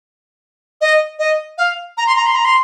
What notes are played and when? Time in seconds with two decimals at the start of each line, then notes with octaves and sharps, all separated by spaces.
0.81 D#5
1.19 D#5
1.58 F5
1.97 A#5
2.07 C6
2.16 A#5
2.26 C6
2.35 A#5
2.45 C6